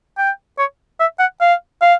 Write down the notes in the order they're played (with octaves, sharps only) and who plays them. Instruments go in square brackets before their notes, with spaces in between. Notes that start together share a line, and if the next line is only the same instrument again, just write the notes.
[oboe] G5
C#5
E5
F#5
F5
F5